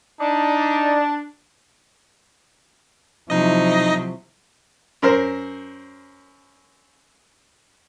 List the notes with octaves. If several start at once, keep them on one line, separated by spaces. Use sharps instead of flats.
D4 D#4 D5 A5
C3 F3 F#3 D#4 E4 D#5
F#2 A#4 C5